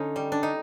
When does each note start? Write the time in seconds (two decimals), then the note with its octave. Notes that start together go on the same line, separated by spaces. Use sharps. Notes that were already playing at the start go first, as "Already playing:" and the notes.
Already playing: D3 C#4 D#4
0.16 G3
0.32 D4
0.43 D#4